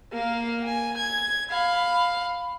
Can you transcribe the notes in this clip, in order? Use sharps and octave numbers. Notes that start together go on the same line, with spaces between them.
A#3 F5
G#5
G#6
F5 B5